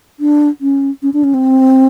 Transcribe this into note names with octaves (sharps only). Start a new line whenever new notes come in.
D4
C#4
C#4
D4
C#4
C4